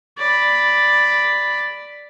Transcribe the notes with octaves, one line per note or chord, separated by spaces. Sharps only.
D5 B5